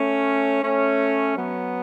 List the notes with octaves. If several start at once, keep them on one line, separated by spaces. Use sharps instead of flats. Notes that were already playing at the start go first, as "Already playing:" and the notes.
Already playing: A3 C#4
A3 C#4
F#3 B3